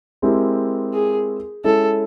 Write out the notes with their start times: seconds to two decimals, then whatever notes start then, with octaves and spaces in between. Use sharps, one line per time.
0.22 G#3 C4 E4 G4 A#4
0.94 G#4
1.64 G#3 C#4 E4 A4